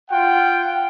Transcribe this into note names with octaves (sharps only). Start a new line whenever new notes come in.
F4 F#5 G5